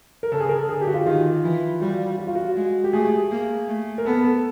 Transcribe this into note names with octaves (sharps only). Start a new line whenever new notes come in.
A#4
C#3 A4
G#4
A#4
A4
D3 G#4
G4
F#4
F4
D#3 F4
E3
G3 F#4
F#4
F4
F#4
G#3
G4
A3 G#4
A#3
A3
A#4
B3 A4
A4